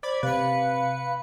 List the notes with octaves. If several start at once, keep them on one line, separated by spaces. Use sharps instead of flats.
C5 D5 B5 G#6
C3 B4 F5 C#7